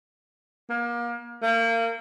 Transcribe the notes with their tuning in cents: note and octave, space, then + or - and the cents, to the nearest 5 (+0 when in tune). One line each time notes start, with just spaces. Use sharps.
A#3 +30
A#3 -30